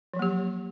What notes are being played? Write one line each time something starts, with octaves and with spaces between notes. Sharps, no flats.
F3 F#3 A#3 G4